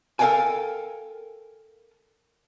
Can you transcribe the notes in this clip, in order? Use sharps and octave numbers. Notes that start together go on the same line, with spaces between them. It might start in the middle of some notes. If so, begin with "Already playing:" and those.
A4 A#4 C#5 F5 G5 G#5